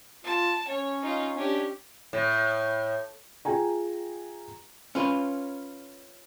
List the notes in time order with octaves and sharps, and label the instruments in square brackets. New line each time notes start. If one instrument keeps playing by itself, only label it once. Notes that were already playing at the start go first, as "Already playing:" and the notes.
[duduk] F4 [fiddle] A5
[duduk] C#4 [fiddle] C#5
[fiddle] D#4 F4
[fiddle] C#4 G4 [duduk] D4
[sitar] A2
[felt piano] F4 G#4 G5 G#5 A#5
[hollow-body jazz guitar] C#4 F4 B4